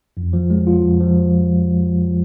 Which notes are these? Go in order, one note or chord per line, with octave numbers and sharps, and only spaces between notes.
F2
F3
G#3
F4
F2
F3